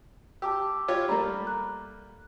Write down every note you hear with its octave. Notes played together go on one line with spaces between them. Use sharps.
G4 A5 D6 E6
F4 G4 C#5
G3 A3 A#3 A#5 B5 D6
F#6